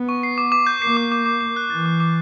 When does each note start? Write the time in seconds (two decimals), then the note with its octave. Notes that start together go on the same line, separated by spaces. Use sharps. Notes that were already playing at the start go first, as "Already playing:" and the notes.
Already playing: B3
0.09 C#6
0.23 C7
0.38 D6
0.52 D6
0.67 G6
0.82 A#3 C7
0.97 D6
1.12 D6
1.26 D6
1.40 D6
1.56 F#6
1.70 E3 A6
1.86 D6
2.00 D6